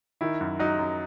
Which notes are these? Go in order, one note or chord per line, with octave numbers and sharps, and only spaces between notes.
D#3 E4
F#2
F#3 D#4
F#2